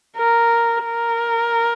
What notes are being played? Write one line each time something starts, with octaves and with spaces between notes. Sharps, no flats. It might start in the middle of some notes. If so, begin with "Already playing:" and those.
A#4
A#4